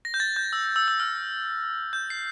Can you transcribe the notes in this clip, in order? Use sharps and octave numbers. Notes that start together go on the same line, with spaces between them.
A#6
G6
A6
G6
E6
E6
E6
F6
G6
C7